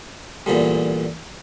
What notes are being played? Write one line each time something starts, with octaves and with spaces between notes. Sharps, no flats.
E2 A#2 D3 G3